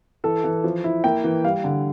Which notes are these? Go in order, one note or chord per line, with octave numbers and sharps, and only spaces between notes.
E3 A4
E3
F3
E4
A#3 G5
E3
G3 F5
D3